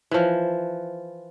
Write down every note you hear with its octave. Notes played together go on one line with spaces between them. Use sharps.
E3 F3